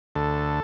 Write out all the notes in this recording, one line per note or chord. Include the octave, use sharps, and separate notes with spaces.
D2 A4